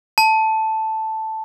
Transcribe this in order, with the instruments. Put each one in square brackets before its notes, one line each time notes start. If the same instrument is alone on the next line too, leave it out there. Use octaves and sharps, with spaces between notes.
[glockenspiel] A5